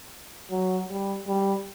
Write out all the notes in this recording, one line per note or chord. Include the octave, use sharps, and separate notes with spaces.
F#3
G3
G3